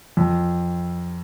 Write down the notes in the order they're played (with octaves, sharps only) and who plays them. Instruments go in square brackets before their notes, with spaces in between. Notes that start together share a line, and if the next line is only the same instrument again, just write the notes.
[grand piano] F2